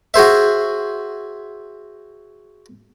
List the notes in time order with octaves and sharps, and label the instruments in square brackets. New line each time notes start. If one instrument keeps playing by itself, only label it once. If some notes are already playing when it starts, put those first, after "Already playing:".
[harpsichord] F#4 G#4 C5 E5